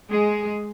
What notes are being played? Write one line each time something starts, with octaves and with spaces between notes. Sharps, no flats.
G#3 G#4